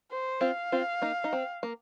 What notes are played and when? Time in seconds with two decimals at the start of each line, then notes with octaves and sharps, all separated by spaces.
0.11 C5
0.41 C4 F4 F5
0.72 C4 F4
1.02 A#3 D#4
1.24 D#4
1.33 C4
1.63 A#3